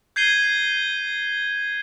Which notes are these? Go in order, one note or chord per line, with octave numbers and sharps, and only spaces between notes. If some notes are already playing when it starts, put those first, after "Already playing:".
G6 G#6 C7 D#7 G7